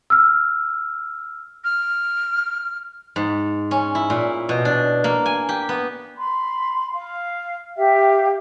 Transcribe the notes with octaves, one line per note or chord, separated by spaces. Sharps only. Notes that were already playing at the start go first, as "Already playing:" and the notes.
E6 F6
F6
G#2
C#4
E4
A#2
B2
D4
A#3
G#5
G4
B3
B5 C6
F5
G4 E5 F5 G5